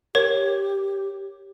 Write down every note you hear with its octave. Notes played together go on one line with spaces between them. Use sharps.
G4 A#4 C#5